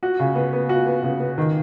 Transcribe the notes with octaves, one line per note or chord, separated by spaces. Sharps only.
F#4
C#3
B3
B3
F#4
B3
C#3
B3
D#3